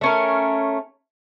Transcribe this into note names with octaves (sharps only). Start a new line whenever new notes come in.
A3 C#4 A#4